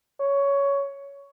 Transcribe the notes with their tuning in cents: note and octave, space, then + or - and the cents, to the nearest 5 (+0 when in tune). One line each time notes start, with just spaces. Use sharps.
C#5 +10